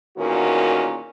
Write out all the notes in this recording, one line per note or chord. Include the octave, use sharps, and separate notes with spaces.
E2 A#2 D#3 C#4 F#4 A#4